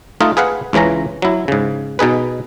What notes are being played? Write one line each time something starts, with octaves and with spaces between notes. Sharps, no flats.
A3 D#4 F4 D#5
G#4 B4 F5 F#5
C#2 C#3 E3 C#4 A#5
F#3 E4
G#2 C#3
B2 D#4 G#4 B4